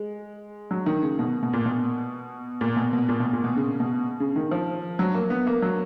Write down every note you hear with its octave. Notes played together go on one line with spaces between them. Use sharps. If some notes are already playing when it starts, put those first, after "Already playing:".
Already playing: G#3
F#3
D#3
C#3
B2
B2
A#2
B2
A#2
B2
B2
A#2
B2
A#2
B2
C#3
B2
C#3
D#3
F3
F#3
A#3
B3
A#3
F#3